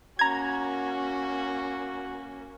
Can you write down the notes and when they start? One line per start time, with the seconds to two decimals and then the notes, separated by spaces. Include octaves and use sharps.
0.19 A#3 C#4 F#4 A#5 G#6